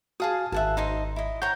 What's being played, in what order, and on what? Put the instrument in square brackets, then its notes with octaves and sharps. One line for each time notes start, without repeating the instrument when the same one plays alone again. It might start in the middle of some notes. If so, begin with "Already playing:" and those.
[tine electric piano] F#4 F5 G#5 [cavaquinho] G#4 A5 D#6
[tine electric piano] G#1 [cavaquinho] E5 F#5 A5
[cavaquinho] D#4 C5 D#5
E4 D#5
[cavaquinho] C#5 G5 A#5 [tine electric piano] F#5 G6